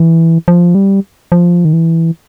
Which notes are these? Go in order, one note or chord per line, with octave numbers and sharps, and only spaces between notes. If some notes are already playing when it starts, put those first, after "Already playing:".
Already playing: E3
F3
G3
F3
D#3
E3